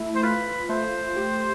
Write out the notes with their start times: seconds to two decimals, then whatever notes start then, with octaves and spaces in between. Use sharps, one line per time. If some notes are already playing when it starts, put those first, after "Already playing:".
Already playing: A3 E4
0.15 C5
0.23 F4 B4
0.69 A3 C5
1.17 G4